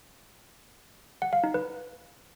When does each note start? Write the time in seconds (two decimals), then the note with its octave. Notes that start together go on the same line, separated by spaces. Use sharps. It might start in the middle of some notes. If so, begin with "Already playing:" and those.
1.22 F#5
1.33 F5
1.44 D#4
1.54 B4